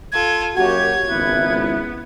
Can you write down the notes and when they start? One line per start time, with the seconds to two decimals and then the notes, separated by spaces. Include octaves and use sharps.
0.12 F4 A4 G#6
0.56 F#2 A#3 F#4 G4 C#5 G#6
1.09 G#1 C#2 B3 E4 F#6